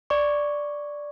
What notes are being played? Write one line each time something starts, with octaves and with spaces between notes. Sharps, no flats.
D5 C#6